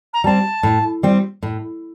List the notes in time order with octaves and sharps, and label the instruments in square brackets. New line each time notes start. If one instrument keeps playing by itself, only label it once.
[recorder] A#5
[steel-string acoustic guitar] G3 C4 [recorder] A5
[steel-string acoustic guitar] A2
G3 C4
A2